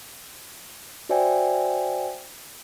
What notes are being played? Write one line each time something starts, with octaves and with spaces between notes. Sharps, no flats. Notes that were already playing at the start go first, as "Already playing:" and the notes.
F#4 C5 D5 E5 G5 G#5